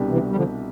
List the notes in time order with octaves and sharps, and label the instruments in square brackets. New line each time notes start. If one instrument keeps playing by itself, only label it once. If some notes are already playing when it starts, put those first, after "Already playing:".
Already playing: [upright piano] C2 B2 B3 D4 G4
[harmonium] C3 E3
G3
D3 F3